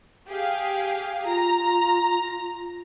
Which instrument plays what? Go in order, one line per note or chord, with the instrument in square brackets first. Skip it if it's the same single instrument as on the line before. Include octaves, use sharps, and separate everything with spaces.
[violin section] G4 G#4 F5
[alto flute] F4 [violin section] A#5